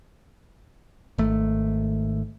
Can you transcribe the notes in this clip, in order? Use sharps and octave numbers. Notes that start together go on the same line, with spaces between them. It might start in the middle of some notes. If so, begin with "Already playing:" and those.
G#1 A3